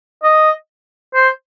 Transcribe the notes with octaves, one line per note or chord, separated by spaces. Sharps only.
D#5
C5